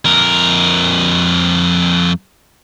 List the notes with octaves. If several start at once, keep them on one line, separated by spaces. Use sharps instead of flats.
F2 A#4